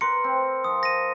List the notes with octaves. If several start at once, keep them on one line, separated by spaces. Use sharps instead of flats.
A#4 B4 C6 C#7
C4
F3 D#6
A#6 D#7